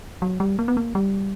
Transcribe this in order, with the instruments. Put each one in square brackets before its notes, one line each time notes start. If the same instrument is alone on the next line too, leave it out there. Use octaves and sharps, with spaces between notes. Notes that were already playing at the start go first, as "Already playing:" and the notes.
[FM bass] F#3
G3
A#3
B3
A#3
G3